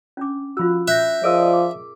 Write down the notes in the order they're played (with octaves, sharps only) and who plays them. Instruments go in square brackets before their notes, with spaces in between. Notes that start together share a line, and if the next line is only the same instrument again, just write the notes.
[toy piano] C#4 D4 D6
[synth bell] F3 F#4 [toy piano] F4 B5 E6
[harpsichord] E5 [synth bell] F#6 G6 A#6
[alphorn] F3 [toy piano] G#4 A#4 E6 [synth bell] D5 D#5 D#6
[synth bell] D6